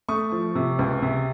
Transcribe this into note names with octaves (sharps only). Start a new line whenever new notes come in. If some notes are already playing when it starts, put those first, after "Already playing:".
A3 C#6 D#6
F3
C3
C#2
C3